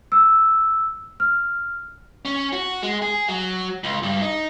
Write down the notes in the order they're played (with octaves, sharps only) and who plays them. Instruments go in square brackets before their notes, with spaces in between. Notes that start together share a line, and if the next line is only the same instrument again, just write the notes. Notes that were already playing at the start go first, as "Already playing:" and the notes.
[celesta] E6
F6
[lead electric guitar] C#4
F#4
G#3
G#4
F#3
C#2
G2
D#4